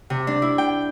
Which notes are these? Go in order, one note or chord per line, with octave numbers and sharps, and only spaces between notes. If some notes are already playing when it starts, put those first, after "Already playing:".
C3
D4
E4
G5